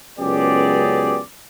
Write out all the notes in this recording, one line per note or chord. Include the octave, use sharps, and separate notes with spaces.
C#2 F#2 B3 G4 G#4 D5